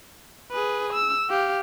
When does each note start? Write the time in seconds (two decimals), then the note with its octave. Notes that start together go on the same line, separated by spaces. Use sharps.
0.52 G#4 B4
0.93 E6
1.30 G4 F5